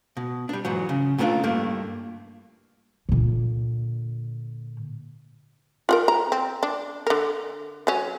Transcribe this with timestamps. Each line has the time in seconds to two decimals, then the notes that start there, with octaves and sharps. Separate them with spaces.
0.17 B2
0.49 G3 D4
0.65 G#2 E3 F#3
0.89 C#3
1.18 A#2 A3 B3 C4 D4 F4
1.44 G2 A3 A#3
3.09 A#2 D3
5.89 F4 F#4 A#4
6.08 A#5
6.32 C4
6.63 D4
7.07 D3 A#4
7.87 F#3 C#4